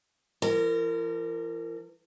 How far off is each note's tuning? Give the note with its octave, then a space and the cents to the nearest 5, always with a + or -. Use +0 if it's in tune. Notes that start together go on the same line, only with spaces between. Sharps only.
E3 +45 A#4 -30